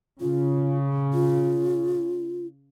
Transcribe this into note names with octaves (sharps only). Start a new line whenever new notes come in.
C#3 F4
F4